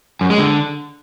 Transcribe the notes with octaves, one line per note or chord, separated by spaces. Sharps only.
F#2
G#3
D3